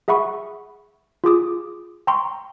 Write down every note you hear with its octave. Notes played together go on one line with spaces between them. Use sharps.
G#4 E5 F#5 B5 C#6
F4 G#4 D6 D#6
G5 A#5 C6 C#6